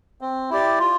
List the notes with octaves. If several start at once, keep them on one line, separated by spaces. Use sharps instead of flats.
C4
E4 G4 D5
F4